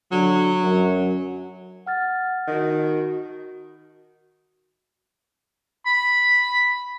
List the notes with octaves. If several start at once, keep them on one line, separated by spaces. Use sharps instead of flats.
D3 F#3
F#2
F#5 F6 A6
D#3 F#4 D#5
B5